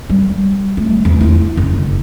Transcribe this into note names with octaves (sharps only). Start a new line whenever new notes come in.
G3
A3
E2
E4 F4
F#1